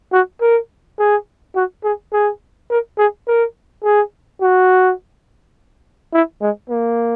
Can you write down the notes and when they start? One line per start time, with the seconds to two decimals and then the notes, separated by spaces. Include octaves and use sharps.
0.13 F#4
0.41 A#4
0.99 G#4
1.56 F#4
1.84 G#4
2.13 G#4
2.70 A#4
2.98 G#4
3.27 A#4
3.84 G#4
4.41 F#4
6.13 E4
6.42 G#3
6.70 A#3